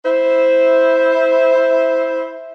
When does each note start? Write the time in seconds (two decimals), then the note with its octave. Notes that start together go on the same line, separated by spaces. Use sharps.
0.04 E4 C5